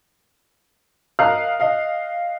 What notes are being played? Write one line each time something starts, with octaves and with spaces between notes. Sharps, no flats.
A#4 D#5 F5 D#6 F6 F#6
D#5 F5